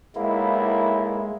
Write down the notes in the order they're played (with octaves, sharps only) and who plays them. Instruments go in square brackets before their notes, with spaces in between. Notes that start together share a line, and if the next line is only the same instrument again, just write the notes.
[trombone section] B1 A#3 E4 [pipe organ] G#3